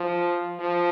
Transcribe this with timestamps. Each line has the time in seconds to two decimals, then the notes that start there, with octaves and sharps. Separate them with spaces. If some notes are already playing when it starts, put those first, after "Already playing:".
Already playing: F3
0.59 F3